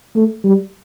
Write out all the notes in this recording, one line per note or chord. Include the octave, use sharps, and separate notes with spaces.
A3
G3